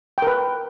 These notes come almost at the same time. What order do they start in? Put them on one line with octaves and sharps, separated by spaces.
G5 A#4 B4